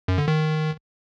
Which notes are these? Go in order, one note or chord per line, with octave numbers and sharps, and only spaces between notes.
F#2
D3
D#3